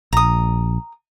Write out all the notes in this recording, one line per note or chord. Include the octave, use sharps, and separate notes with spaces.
A#1 A#5 D#6